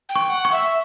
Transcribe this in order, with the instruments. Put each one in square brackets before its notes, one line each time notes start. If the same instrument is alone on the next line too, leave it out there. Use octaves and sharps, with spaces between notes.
[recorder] G5
[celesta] C#6
[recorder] F#5
[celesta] C#6
[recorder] E5